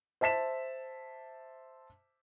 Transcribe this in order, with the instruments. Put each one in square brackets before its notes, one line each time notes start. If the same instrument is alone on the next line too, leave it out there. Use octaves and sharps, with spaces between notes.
[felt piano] C5 E5 A5 B6 E7